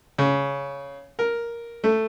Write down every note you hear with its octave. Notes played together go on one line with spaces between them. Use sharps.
C#3
A#4
A3